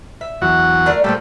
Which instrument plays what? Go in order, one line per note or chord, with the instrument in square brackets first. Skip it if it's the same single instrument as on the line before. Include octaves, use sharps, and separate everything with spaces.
[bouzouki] E5
[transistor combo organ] E2 F#3 F#4
[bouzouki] A3 D4 A#4
[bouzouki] A#2 B3 C4 [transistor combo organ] G3 A3